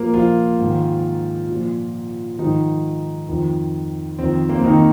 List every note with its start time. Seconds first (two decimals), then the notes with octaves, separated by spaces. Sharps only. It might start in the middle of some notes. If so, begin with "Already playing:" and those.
Already playing: A#2 F3 A#3 A#4
0.14 F3 F4
0.58 G#2 D#3
1.48 A#2 F3
2.38 G#2 D#3 F3 D#4
3.29 F2 D#3
4.19 F2 D#3 C4
4.49 A#3
4.56 C4
4.64 D#3 D#4